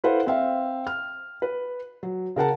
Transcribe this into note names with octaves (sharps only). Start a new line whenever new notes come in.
E4 A4 B4 C5 F5 F#5
C4 E5 F5
F6
B4
F#3
C#3 A#4 F#5 A5